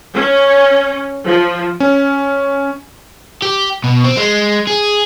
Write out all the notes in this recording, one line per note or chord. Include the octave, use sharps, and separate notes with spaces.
C#4
F3
C#4
G4
B2
C4
G#3
G#4